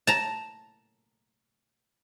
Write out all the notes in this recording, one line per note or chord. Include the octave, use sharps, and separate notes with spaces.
A5 A#5